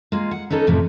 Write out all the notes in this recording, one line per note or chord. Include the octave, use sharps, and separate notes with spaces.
G#3 A#3 F4
F#5
B3 C#4 D#4 A4 A#4
F2 A2 C3 F3